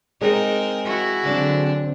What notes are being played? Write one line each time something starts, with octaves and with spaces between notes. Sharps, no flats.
G#3 C4 D#4 A#4
E4 F#4
D3 F#3 C4 D4